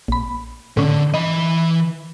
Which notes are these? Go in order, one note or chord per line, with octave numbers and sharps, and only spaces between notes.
A#1 B5
A2 D3 C#4
E3 D#5 B5